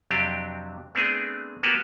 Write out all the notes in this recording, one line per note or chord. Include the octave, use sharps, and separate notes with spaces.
F2 C3 F#3 C4 D4 G4
A3 B3 C4 D4 G#4
A#3 B3 F#4 G4 B4